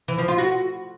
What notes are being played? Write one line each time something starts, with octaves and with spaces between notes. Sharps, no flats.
E3
F3
F4
F#4